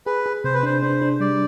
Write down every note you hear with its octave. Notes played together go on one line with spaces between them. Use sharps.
G#4 B4
G#4
C3 C5
B4
D4 C5
D4 C5
D4
G3 D5